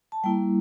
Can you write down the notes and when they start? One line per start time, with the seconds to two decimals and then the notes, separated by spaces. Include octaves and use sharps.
0.12 A5
0.24 G3 A#3 E4 G5